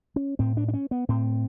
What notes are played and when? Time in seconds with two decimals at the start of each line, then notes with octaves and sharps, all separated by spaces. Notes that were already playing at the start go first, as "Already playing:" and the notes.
0.16 C#4
0.39 A2 C4
0.57 D4
0.68 D4
0.74 C#4
0.91 B3
1.09 A2 C4